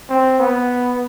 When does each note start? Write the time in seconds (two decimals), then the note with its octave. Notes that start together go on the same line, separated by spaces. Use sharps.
0.09 C4
0.39 B3